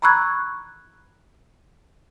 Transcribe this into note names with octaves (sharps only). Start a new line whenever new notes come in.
A#5 B5 C#6 E6 F#6 G#6